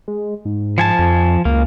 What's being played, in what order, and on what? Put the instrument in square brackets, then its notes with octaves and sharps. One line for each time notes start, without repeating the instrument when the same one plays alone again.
[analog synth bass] G#3
G#2
[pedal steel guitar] F3 G#5 A5
[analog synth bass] F2
[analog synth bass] C#2 [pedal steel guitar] A#3